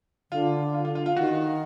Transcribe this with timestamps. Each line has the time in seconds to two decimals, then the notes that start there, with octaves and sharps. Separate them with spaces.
0.31 D3 F4
0.74 F4
0.85 F4
0.95 F4
1.06 F4
1.17 D#3 F#4